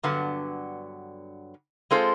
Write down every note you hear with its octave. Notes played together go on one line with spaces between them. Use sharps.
G2 D3 F#3 B3
G#3 C4 F4 A4 C5